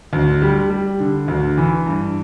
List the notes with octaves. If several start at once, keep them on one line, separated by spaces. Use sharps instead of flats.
D2
G3
G3
D3
D2
E3
G2